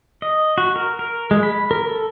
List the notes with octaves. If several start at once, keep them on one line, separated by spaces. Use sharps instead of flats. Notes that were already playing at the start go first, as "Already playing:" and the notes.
D#5
F#4
A#4
A#4
G#3
B5
A#4
A4